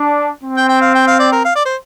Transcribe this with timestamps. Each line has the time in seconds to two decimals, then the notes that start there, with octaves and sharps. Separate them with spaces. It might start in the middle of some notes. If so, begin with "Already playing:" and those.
Already playing: D4
0.44 C4
0.57 G5
0.69 G5
0.81 F5
0.95 G5
1.07 F5
1.19 D5
1.32 A#4
1.45 F5
1.56 D5
1.65 C5